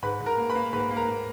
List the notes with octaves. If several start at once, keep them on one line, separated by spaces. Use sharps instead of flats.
G#2 B4 B5
G#2
A#4 A#5
A#3
B4 B5
A#3
G#2 B4 B5
A#3
A#4 A#5
A#3